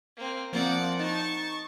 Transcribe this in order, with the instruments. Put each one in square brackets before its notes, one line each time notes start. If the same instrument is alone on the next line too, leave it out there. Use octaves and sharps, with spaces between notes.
[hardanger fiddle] A#3 C4
[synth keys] F3 A#3 C4 [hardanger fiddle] D5 F#5
[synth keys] D#4 [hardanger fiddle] A5 C#6